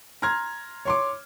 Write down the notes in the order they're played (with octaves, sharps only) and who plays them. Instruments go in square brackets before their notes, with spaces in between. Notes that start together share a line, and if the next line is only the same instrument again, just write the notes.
[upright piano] A#5 C6 F6 G#6
C#5 C6 D6